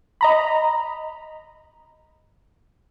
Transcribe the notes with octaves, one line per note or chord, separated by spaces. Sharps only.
D#5 A#5 B5